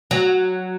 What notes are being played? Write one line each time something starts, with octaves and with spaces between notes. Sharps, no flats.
F#3